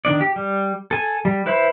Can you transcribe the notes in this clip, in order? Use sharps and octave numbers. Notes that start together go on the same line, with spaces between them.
D#3 D4 D5
G4
G3
A4 G#5
G3
E4 B4 C5 E5 B5